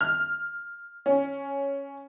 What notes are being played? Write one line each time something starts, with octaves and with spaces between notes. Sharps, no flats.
F6
C#4